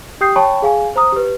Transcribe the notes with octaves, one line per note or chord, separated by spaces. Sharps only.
G4 G5 D#6 G6 C7
C#5 G5 A5 B5 C#6
G#4 F5 G#5
C5 A#5 D#6
G4 B4